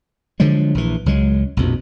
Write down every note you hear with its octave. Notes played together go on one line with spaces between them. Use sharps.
D3 F3 F#3 G#3
A#1 E3
C#2 F#3 G#3
A#1 F2 B2